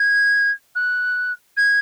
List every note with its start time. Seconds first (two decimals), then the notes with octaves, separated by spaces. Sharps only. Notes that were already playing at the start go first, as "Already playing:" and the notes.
Already playing: G#6
0.75 F#6
1.56 G#6